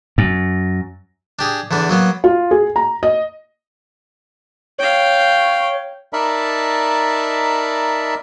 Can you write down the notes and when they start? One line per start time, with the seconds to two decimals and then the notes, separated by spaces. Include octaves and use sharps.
0.18 F#2
1.39 D4 G4 G#4
1.71 E2 D3 E3 D4
1.89 F#3 A#3 B3
2.24 F4
2.51 G#4
2.76 A#5
3.03 D#5
4.79 C#5 F5 G5
6.13 D#4 A#4 D5 E5 A5 B5